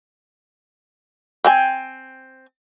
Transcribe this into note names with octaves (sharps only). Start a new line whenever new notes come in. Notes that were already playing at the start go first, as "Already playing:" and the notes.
C4 G5 G#5